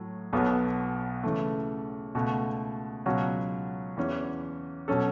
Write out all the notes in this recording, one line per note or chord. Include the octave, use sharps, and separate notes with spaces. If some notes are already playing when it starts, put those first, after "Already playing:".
Already playing: A2 F#3 A3
B1 B2 F#3 B3 A4
C#3 E3 A3
C#2 B2 A3 F#4
C#2 B2 F#3 C#4 F#4
E2 E3 C#4
B2 F#3 C#4 A4